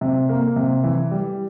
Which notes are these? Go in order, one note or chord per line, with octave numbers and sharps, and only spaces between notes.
C3
A#3
C3
E3
G3